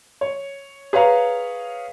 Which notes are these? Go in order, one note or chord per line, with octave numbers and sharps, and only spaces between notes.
C#5
G#4 B4 C#5 F5 A#5